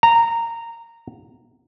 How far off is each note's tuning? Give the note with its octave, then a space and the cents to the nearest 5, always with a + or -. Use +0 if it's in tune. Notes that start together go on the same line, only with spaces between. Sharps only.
A#5 -15